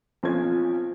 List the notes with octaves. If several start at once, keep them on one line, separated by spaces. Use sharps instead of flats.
B1 F3 C4 C#4 F4 G#6